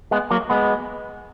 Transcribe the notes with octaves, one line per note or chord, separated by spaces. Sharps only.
G#3 B3
F#3 A#3
G#3 B3